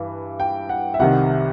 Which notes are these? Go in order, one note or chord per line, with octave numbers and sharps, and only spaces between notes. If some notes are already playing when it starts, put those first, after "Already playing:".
Already playing: G2 E3
G5
F#5
E5
C2 C3 D#3 F#5